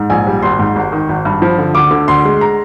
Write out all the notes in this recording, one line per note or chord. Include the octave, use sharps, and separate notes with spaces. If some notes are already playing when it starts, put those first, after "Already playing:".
Already playing: G#2
A#1 G#5
G3
G#1 C6
G#2
G#1
D#3
G#1
G2
F3
D3
D2 D6
D3
D2 C6
G#3
A#5